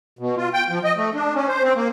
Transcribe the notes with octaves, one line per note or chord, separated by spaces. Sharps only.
B2
F4
G5
F3
D#5
A3
D4
C#4
C5
C4
A#3